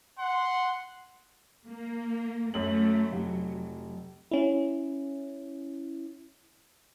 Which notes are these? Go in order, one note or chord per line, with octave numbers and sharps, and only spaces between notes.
F#5 C6
A#3
F#2 F#3 A3 F#7
F1 F#3
C#4 E4